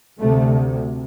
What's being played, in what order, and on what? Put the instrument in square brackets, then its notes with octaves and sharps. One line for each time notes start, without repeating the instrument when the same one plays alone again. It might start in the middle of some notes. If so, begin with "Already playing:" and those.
[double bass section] D2 C3 A3